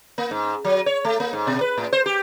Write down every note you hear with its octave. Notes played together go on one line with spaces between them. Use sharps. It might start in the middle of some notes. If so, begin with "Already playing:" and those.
A#3
G#2
F#3
C#5
A3
A#3
G#2
B2
B4
A2
C5
G4